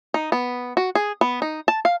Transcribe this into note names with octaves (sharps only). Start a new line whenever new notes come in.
D#4
B3
F#4
G#4
B3
D#4
A5
F5